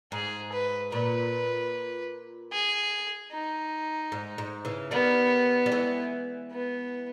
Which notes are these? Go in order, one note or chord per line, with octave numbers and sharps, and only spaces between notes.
G#2 G#4
B4
A#2 B4
G#4
D#4
G#2
G#2
C#3 E3
D#3 G3 B3
G3
E3 G#3
B3